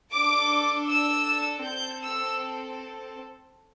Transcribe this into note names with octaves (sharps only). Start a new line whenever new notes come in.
D4 A4 D6
E6
C4 A4 G6
E6